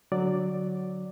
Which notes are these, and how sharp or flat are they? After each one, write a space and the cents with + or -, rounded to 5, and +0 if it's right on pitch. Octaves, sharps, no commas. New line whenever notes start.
D3 +0 F#3 +0 D5 +0